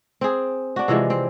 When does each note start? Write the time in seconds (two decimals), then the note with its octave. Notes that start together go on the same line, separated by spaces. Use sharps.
0.21 C4 G#4
0.76 D4 F#4
0.88 C3 E3 F3 G#3
1.10 C4